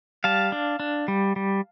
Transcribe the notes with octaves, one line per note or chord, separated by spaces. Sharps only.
G3 F5 A5
D4
D4
G3
G3